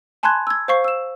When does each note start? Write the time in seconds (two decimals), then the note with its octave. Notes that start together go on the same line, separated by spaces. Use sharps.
0.23 G#5 A5 B5 C6 F#6 G#6
0.47 E6 G#6
0.68 C5 F5 C#6 C7
0.84 E6 E7